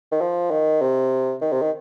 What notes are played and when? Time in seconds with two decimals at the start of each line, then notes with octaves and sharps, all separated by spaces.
0.12 D#3
0.21 F3
0.51 D#3
0.81 C3
1.41 D#3
1.52 C3
1.62 D#3